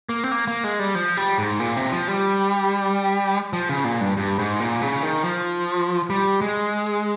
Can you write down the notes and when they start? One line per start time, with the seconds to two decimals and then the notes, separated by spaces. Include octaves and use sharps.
0.09 A#3
0.24 C4
0.32 A#3
0.48 A#3
0.64 G#3
0.79 G3
0.95 F3
1.17 G3
1.38 G#2
1.60 A#2
1.76 C3
1.92 F3
2.08 G3
3.53 F3
3.69 C#3
3.84 A#2
4.01 G2
4.17 G2
4.39 G#2
4.60 A#2
4.82 C#3
5.03 D#3
5.24 F3
6.10 G3
6.41 G#3